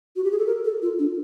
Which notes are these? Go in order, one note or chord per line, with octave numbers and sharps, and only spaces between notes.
F#4
G4
G#4
A4
A#4
A4
F4
D4